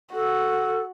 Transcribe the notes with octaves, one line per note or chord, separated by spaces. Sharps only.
F#4 A4